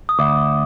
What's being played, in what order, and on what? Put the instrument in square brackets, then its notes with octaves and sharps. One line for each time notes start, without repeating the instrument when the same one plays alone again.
[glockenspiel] D#6
[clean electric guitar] D2 [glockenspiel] D6